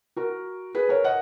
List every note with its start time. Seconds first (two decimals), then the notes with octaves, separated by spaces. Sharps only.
0.16 F#4 A#4
0.75 G#4 B4
0.89 A#4 C#5
1.04 D#5 F#5